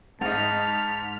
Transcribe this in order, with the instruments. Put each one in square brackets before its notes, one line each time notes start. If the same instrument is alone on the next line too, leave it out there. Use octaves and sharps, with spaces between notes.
[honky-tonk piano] G#2 D#5 [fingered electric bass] G#3 [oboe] A5 [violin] F6 B6